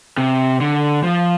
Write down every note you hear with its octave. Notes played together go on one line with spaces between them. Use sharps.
C3
D3
F3